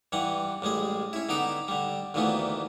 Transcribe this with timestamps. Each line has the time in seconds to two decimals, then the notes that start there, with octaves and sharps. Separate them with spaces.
0.12 G2 E3 G3 F#5
0.62 A1 G3 G#3 G#4
1.13 C#4 E4
1.29 D3 B3 D#4 G5 D6
1.68 D3 G3
2.14 D2 A#2 D#3 E3 A3 B3